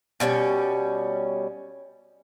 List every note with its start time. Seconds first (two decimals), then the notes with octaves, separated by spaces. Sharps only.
0.20 B2 G3 B3 C#4